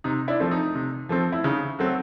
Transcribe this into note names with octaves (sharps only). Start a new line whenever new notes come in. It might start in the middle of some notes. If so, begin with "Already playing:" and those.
C3 D#4
D4 E4
F3 A3 C4
D#4
C3
F3 A3 C4
E4
C#3 D#4
F#3 A3 C4